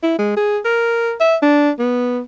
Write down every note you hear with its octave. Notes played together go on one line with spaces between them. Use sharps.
E4
G#3
G#4
A#4
E5
D4
B3